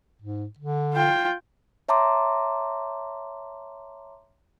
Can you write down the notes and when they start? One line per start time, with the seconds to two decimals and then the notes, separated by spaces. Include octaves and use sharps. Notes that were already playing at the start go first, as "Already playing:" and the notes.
0.21 G#2
0.58 D3
0.94 F4 G5
1.89 C#5 E5 A5 A#5 C6 D6